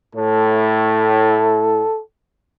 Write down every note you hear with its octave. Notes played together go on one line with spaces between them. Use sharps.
A2 A4